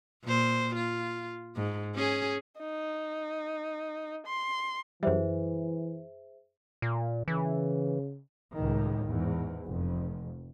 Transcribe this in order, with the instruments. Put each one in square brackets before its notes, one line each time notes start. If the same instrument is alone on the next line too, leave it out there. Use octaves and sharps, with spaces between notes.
[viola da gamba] A#2 C5
F4
G#2
C#4 G#4
[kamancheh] D#4
C6
[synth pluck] F#2 G3 [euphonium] E3 [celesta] G#4 C5 E5
[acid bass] A#2
[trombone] C#3 [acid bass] E3
[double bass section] C#2 A2 D#3
E2 G#2
F1 F2